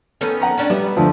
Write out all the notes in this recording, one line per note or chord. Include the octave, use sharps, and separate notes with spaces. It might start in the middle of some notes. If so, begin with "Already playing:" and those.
D#3 B3 C#4 A4
F#5 G5 A#5
C#4 D4
G3 B3 E5
D2 F3